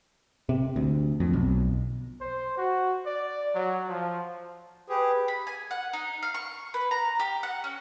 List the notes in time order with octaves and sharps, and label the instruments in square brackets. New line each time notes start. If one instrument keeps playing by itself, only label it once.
[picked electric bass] C3
D2
F2
B1
[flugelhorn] C5
F#4
D5
F#3
F3
[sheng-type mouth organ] G4 G#4 [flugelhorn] B4
[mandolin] B5
G#5
F#5
D#4
F5
C#6
B4
A#5
G4
F#5
C#4